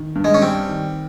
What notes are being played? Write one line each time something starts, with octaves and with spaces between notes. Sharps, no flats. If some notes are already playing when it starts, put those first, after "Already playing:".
Already playing: D#3
G2
G#3
C#4
G3 C4
D#3